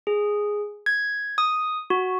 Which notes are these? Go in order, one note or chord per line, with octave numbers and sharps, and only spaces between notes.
G#4
G#6
D#6
F#4